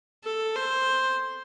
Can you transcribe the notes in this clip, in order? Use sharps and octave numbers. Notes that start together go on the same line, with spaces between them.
A4
C5